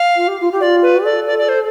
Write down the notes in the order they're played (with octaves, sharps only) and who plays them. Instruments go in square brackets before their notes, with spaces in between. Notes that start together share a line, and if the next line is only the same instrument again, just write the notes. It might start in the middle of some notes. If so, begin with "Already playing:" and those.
Already playing: [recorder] F5
[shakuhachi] F4
G4
F4
G4
[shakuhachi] F4 [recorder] D5
[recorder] B4
[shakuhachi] A4 [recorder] D5
[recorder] D5
D5
C5